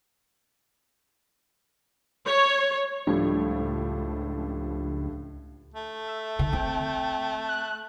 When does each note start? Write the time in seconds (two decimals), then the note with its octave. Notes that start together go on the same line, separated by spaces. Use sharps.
2.26 C#5
3.07 C#2 A2 F3 G3 D4
5.74 A3
6.07 E5
6.39 D3 D#3
6.53 C4 G5
7.49 F#6